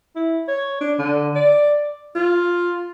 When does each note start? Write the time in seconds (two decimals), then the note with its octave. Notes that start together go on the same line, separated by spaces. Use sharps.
0.16 E4
0.48 C#5
0.81 D4
0.99 D3
1.36 D5
2.16 F4